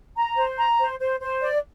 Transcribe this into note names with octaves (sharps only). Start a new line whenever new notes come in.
A#5
C5
A#5
C5
C5
C5
D5